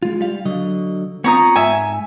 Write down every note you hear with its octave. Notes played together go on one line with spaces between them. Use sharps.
G#3 F4
G3 F5
D3 F#3 D#5
B3 C4 F4 C#5 A#5 D#6
G#2 E5 G#5